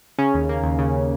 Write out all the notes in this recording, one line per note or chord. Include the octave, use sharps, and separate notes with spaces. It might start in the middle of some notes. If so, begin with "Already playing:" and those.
C#3 C#4
D#2
A#3
D#2
C#3